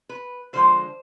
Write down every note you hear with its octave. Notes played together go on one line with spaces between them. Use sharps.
B4
D3 F3 G#3 C5